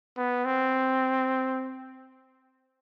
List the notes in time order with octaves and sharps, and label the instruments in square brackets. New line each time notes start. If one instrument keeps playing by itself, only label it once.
[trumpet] B3
C4